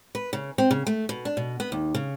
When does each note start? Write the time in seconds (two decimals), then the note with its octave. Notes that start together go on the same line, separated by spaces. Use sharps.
0.15 B4
0.33 C#3
0.58 C4
0.71 C#3
0.87 A3
1.09 B2
1.25 D4
1.37 B2
1.60 B3
1.72 D#2
1.94 C#3